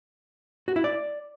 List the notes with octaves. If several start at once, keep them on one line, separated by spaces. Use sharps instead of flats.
F#4
E4
D5